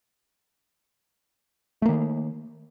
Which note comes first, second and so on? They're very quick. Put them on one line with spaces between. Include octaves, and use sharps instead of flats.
A3 A#3 D#3